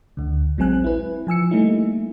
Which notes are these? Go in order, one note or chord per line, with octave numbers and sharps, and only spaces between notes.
D2 D3
A1 F#3 G#3 C4 G#5 F#6
E4 B4
F3 G#5 E6 C#7
G3 A3 A#3 D#4 E4